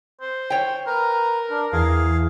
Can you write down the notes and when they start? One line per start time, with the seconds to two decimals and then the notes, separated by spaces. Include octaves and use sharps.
0.21 C5
0.50 C#5 G5
0.87 A#4 B4 A#5
1.50 D4
1.72 E2 G#4 F5